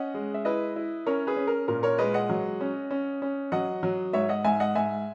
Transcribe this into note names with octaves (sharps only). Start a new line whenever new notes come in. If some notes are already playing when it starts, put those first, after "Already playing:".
Already playing: C#4 D#5 F#5
G#3
E5
E4 B4 D#5
E4
C#4 A#4 C#5
G#4 B4
C#4
A#4
A#2 A#4
A#4 C#5
G#3 B4 D#5
D#5 F#5
F#3
C#4
C#4
C#4
F#3 D#5 F#5
F#3
G#2 C#5 E5
D#5 F#5
G#2 E5 G#5
D#5 F#5
G#2 E5 G#5